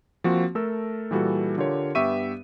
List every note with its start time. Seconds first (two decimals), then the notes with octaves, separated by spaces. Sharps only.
0.24 F3 A#3 C4 F#4
0.55 A3 A4 A#4 E6
1.11 A#2 E3 G3 F#4 A4
1.58 D3 F4 G4 A#4 C#5
1.95 G2 B3 G4 E5 C#6 D#7